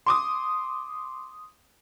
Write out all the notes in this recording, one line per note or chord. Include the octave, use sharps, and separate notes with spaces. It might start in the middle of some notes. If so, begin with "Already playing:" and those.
C6 D6 D#6